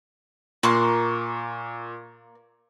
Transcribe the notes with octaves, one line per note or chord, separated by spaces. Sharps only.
A#2 A#3 C6 C#6 F#6